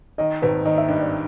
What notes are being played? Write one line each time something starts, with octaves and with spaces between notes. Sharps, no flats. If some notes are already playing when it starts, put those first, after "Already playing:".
D#3 D#5
G#1 B4
D#3 D#5
E5
G2 D#5
D5